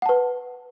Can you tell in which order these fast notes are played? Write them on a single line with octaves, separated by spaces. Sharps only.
F#5 A5 B4